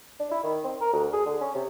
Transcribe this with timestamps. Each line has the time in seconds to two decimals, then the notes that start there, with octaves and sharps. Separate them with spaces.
0.20 D4
0.31 E4
0.44 D#3
0.64 C4
0.81 A#4
0.93 D2
1.13 G#4
1.26 D3
1.41 C#4
1.55 C3